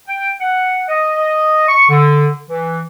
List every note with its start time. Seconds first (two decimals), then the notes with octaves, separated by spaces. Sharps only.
0.07 G5
0.40 F#5
0.88 D#5
1.68 C#6
1.89 D3
2.49 E3